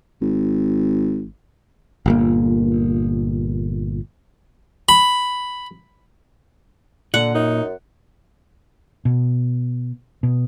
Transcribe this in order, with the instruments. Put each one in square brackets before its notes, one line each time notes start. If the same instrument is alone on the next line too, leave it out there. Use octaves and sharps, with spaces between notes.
[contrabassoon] G#1
[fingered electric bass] G1 A#2 A#3
[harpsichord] B5
[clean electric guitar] A#2 [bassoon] D3 [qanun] F#5
[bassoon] F#2 [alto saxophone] D#4
[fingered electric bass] B2
B2